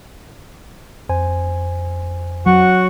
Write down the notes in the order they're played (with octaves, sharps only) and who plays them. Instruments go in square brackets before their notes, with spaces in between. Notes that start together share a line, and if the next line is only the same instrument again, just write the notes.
[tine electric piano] F2 C5 G#5
[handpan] F#3 [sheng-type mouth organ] F#4 F#5 C#6